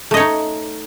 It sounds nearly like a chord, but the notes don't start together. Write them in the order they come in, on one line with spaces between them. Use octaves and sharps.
A3 D#5 C#5 D#4